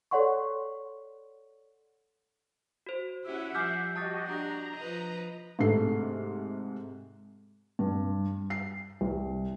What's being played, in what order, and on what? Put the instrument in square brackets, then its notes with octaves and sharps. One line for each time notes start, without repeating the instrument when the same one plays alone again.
[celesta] A4 C#5 D5 F#5 C6 C#6
[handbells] F#4 C5
[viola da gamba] C#4 E4 G4 [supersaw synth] E5 F#5
[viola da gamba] F3 G3 [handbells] G#5 D6 F6 [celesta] G6 C7
[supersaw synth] F#4 G4 D#5 [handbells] A5 D#6 A6
[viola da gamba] D4 [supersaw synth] A#5
[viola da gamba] F3 B4 D#5
[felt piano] G#2 C3 A3 C7
G2
C7
C2